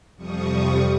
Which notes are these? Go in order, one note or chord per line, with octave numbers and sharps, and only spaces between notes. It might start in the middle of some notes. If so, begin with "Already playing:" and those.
F2 C3 F3 G3 C#6 D#6